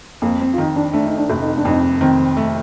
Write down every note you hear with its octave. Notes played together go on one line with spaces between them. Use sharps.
F2 A#3
C4
F4
D#3 D#4
D4
A3 D4
D#4
D4
F1
D#4
D4
F2 D#4
D#3 C4
A3